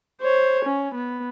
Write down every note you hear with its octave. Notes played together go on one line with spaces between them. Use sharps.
C5 C#5
C#4
B3